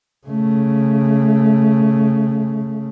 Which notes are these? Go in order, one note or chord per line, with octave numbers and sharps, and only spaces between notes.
C#3 A3